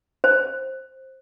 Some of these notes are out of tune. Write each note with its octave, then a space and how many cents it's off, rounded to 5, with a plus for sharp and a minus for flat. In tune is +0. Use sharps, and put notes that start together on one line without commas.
C5 +10